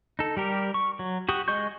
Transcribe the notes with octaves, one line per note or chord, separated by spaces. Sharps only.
D#4 A4
G3 G4 A#4
C#6
F#3
F#4 G4 D#6
G#3 D#5 C#6 G6